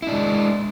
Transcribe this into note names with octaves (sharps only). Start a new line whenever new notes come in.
G#3 D4 E4